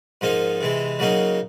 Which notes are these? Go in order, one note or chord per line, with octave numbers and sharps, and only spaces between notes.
G#2 F3 A#3 D#4
C3 E3 G#3
C#3 F#3 A#3 D#4